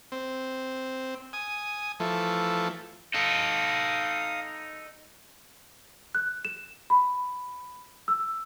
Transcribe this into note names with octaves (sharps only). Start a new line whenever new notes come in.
C4
G#5 D#6
E3 F3 A3
D#4 A4 F5 D#6
F#6
E7
B5
E6